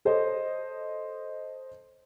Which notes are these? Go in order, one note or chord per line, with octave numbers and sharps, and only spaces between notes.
A4 C5 C#5 D#5